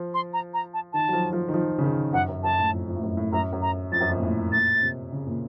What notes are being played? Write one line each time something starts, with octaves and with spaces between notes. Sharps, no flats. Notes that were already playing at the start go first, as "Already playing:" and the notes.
Already playing: F3
C6
A#5
A#5
A5
D#3 A5
F#3
F3
F3
D#3
F3
C#3
D#3
F#2 F#5
F#2
F#2 A5
A2
F2
F2
A2
F#2
A2
F#2 A#5
F#2
A#5
F2 A6
F#2
F2
A#2
A2
A#2 A6
C3
C#3
A#2